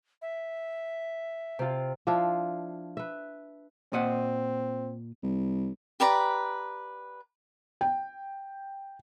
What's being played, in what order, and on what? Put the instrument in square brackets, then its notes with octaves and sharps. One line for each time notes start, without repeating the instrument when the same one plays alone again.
[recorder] E5
[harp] C3 F4
[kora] F3 D4 E4 F4
B4 E5
[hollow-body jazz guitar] A#2 D#5 F#5 [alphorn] C4
[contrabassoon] C2
[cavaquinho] G4 B4 D5 A#5
[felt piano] G5